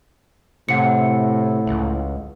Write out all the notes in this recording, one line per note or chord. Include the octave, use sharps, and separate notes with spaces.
A2 C3 F#5 C#7
C#2